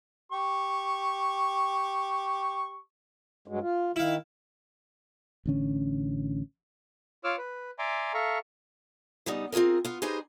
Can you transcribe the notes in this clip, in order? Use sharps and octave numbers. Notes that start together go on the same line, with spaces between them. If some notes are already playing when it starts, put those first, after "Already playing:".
G4 C#6
G2 F#3 G#3
F4
D#3 E4 F5
A1 D3 C#4
F4 C#5 D6 E6 F6
B4
D5 E5 G#5 A#5 C6 D6
A4 E5 F5 A#5 C#6
C#3 G3 B3 D#4
C4 F4 F#4 G#4 A#4
B3 F4
D#4 G4 G#4 B4 C5 D#5